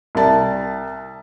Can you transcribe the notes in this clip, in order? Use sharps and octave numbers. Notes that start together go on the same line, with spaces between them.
C2 A5